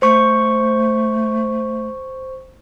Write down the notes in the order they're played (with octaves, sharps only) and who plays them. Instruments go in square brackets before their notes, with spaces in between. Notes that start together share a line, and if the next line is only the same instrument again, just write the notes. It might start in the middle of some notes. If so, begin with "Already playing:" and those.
[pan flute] A3 [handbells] C5 C#6